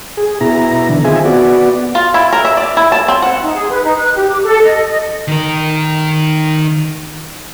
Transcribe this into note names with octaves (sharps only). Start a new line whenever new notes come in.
G#4
B2 E4 A#5
D3 E3
D#3 C4 F4 G#4 E5 G#5
B3 F#4 D5
F4
E4
A#4
E5
D5
E4
A5
C4
F#5
D#4
G#4
B4
D#4
F#6
G4
D6
A4
D#5
D#5
D#3 A#4